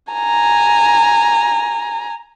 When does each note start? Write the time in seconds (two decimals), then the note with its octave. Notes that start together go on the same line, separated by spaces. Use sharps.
0.13 G#5 A#5